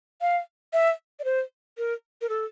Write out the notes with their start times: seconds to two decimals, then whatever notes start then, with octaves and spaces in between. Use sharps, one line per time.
0.21 F5
0.73 E5
1.20 D5
1.24 C5
1.78 A#4
2.21 A#4
2.29 A4